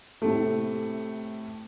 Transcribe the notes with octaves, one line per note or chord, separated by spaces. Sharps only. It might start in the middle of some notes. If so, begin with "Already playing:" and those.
A2 C3 A3